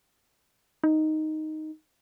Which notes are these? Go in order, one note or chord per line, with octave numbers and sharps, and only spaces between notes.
D#4